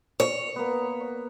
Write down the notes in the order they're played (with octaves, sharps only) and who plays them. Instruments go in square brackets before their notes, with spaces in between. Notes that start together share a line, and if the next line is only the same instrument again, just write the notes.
[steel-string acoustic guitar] C#5
[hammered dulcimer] A#3 B3